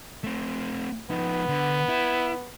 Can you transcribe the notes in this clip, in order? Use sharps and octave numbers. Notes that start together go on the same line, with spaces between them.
A3 C4
F3 B3 D#4
D3
E4